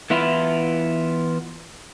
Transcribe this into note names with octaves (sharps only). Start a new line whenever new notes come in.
E3 B3 E4 F4